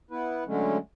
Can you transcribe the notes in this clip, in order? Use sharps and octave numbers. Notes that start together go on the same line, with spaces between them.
B3 E4 B4
D3 F#3 G#3 A3 C#4